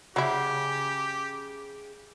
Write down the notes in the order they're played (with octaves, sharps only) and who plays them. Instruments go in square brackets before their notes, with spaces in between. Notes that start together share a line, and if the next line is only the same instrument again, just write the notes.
[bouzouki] C#3 [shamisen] F#3 E4 [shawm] G4